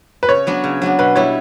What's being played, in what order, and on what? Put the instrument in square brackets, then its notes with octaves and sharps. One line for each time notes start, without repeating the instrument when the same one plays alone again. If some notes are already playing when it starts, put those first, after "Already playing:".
[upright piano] B4
[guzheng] C#3 [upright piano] C#5
[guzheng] F#3 B3 D4
C#3
F#3 B3 D4
[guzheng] B2 [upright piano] B4
[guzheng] G3 B3 E4 [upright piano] C#5